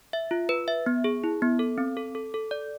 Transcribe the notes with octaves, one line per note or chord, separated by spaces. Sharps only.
E5
F4
B4
E5
B3
G#4
E4
B3
A4
C4
A4
A4
A4
D5